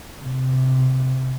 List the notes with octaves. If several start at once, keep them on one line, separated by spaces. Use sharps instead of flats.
C3